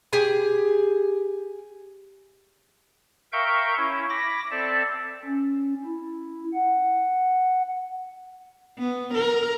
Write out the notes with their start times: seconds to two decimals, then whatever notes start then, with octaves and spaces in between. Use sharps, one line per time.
0.13 G4 G#4 G#5
3.32 A#4 E5 F5 G5 C#6 G6
3.77 C#4 E4
4.09 B5 D6 A#6
4.51 C4 A4 D5 E5 A5
5.25 C#4
5.85 E4
6.54 F#5
8.78 B3
9.14 A#4